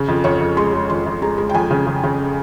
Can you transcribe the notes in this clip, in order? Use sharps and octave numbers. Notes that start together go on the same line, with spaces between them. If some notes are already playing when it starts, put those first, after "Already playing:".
Already playing: C#3
F2
F2 C#5
F2
G#3 C6
G#3
F2 C6
F2
G#3 A#5
G#3
G5
F2 G#5
C#3
C#3
C#3